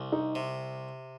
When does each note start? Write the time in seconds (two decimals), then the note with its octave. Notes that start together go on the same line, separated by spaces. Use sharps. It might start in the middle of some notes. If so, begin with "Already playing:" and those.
Already playing: C2
0.12 D#4
0.35 C3